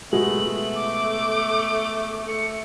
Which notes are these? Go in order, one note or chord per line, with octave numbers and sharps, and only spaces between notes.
B2 G#3 A3 B3 F#7
D6
A3 C#7